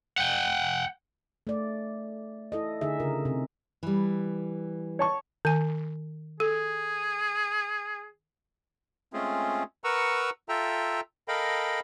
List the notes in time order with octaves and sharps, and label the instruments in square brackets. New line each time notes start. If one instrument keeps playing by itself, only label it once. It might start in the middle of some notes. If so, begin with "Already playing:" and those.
[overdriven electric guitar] F#5 G5
[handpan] A3 D5
E4 A4 D#5
D3 D#4 G#4 E5
C#3 F4 A#4
C3
[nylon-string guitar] E3 G3
[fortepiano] C#5 A5 C#6
[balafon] D#3 G#5
[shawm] G#4 [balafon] A4
[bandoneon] G#3 A3 C4 C#4 F4 G#4
A#4 B4 F#5 A#5 C#6 E6
F4 A4 E5 G5 A#5
A4 A#4 D#5 F5 G5 B5